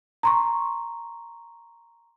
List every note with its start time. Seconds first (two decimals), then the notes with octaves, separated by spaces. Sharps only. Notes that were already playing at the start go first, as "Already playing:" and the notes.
0.23 A#5 C6 C#6